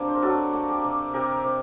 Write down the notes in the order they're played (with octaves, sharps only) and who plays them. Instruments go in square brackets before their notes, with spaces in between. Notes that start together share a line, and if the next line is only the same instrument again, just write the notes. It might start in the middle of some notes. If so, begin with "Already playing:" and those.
Already playing: [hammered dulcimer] C3 A#3 D4
C5
A#4
F#3 F#4 A4
A#3
G4 A#4
C3
C3 G4 A#4
C3